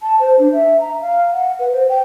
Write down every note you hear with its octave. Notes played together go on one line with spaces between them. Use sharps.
A5
C5
D4
E5
A#5
F5
F#5
B4
C5
G5